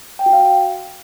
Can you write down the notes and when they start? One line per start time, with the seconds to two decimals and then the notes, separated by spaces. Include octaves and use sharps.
0.19 G5
0.26 F#4
0.33 F5